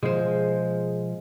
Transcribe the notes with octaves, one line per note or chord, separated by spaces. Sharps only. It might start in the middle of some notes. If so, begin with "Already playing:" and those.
B2 F3 G#3 G#4 C5